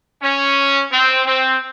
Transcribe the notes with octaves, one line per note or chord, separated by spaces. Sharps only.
C#4
C4
C4